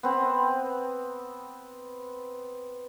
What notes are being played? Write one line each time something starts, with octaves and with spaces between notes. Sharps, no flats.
B3 C4